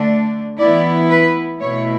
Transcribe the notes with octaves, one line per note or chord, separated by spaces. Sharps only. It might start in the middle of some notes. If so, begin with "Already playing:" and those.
Already playing: D3 A3 D4
E3 B3 E4 D5
B4
B2 A3 E4 C#5